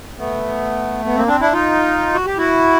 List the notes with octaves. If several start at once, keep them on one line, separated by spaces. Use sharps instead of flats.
A3 B3
B3
A#3 C4
C4 D4
D4 E4
D#4 F4
F#4
G4
E4 F#4